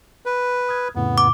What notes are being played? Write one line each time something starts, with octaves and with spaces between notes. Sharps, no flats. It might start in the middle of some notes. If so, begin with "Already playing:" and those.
B4
D#6 F6 G#6
F2 A2 C#3 B3
D6